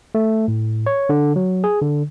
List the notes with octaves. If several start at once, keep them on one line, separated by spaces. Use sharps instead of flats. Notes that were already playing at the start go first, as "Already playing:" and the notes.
A3
A2
C#5
D3
F#3
G#4
D3